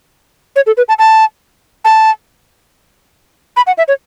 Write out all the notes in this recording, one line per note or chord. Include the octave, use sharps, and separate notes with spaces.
C#5
A4
B4
A5
A5
A5
B5
F#5
E5
C#5